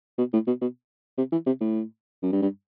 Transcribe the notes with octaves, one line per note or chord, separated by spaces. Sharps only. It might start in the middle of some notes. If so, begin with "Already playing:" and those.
B2
A2
B2
B2
C3
E3
C3
A2
F#2
G2
G2